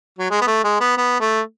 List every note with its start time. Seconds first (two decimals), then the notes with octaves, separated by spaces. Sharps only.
0.18 F#3
0.30 G#3
0.41 B3
0.47 A3
0.64 G#3
0.80 B3
0.97 B3
1.20 A3